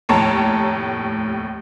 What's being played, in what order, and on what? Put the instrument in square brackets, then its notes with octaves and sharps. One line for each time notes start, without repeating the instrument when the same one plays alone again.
[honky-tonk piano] F1 D#2 A2 C#5 A5 A#5